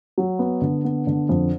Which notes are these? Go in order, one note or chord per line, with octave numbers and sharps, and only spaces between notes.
F#3
B3
D3
B3
D3
F2